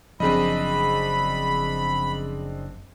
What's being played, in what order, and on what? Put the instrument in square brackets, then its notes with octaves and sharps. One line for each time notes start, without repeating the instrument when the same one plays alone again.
[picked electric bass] F#1 F#2 [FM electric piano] F3 G#4 [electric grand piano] C4 D4 D#5 [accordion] B5